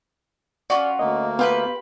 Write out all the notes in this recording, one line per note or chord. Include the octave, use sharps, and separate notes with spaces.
C#4 F4 F#4 D5
D2 A#3 D#5
B3 F4 G4 B4 F5